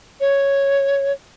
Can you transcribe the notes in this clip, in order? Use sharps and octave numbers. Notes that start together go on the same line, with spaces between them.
C#5